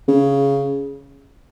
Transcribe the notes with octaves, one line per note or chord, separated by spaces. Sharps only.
C#3